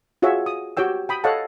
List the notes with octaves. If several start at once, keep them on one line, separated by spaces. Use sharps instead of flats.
F4 F#4 G#4 C#5 E5
D#6
F#4 G4 C#5 G5 E6
G5 B5 D#6
A4 C#5 D#5 F5 F#5 A5